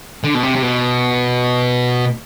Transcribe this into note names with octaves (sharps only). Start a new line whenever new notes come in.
D3
B2
C3
C3
B2